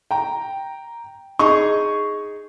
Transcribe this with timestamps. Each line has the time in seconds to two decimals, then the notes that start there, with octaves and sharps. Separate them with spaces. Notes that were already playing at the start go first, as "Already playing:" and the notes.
0.11 G5 A#5
1.39 D#4 G#4 C#6